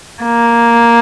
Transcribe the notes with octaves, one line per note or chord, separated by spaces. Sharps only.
A#3